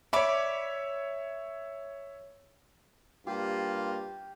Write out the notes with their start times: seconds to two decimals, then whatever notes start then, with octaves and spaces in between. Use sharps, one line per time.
0.13 C#5 D5 E5 B5 D6
3.27 G2 A#3 F4 G4